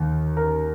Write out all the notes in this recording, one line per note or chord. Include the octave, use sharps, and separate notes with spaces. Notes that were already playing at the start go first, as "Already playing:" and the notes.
Already playing: D#2 D#3
A#4